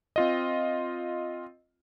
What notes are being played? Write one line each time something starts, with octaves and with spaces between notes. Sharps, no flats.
C4 F4 D#5